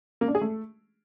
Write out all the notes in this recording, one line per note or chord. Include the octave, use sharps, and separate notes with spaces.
A#3
D4
G#4
A3